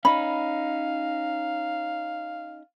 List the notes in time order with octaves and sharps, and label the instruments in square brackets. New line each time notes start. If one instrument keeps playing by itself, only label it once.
[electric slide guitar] C#4 D#4 [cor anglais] F5 [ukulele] B5